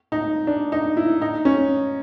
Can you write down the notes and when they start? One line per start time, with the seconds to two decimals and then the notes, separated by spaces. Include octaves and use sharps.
0.12 D#4
0.47 D4
0.72 D#4
0.97 E4
1.22 D#4
1.45 C#4